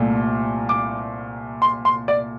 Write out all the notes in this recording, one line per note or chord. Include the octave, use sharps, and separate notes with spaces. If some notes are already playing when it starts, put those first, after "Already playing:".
Already playing: C2 A#2 A3
D6
C6
C6
D5